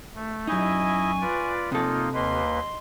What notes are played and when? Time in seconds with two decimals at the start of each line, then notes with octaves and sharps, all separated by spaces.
0.15 A3
0.47 F#2 D#4 E4 D#5 G#5 C#6
1.21 F4 B4 D5
1.72 C3 A#3 D#4 F4 A4
2.13 D#2 A#3 B4 D#5 C6